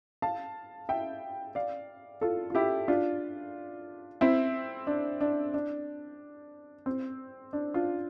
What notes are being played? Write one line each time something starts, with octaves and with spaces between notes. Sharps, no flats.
F5 A5
E5 G5
D5 F5
F4 A4
F4
E4 G4
D4 F4
C4 E4
D4
D4
D4
C4
D4
D4 F4